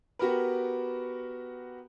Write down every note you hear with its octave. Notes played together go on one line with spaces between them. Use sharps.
B3 F#4 G4 A#4 B4